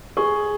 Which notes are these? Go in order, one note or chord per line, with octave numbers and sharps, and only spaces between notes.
G#4 C#6